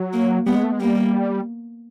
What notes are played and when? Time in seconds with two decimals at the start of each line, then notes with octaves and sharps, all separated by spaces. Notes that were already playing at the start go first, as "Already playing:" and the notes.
Already playing: F#3
0.13 A#3
0.46 G3 B3
0.55 G#3
0.64 A3
0.72 G#3
0.80 G3 A#3